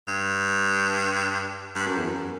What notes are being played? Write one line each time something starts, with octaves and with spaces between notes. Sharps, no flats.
G2
G2
F#2
E2
F#2